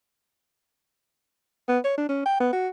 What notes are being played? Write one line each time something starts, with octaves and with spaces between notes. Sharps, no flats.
B3
C#5
D4
C#4
G5
B3
F#4